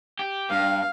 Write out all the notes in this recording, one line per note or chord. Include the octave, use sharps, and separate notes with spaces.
G4
G2 F5